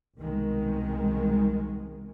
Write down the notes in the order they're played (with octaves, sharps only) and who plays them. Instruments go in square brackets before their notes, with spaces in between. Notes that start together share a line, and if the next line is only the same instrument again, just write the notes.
[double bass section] C2 B2 D#3 G#3